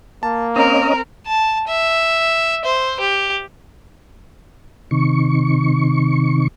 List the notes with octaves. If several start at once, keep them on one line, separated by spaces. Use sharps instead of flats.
A#3 A5
C4 C#4 A#4 D#5
A5
E5
C5
G4
C3 D#3 C#6